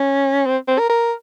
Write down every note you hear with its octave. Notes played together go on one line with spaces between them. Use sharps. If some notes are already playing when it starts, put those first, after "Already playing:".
Already playing: C#4
C4
C4
A#4
A#4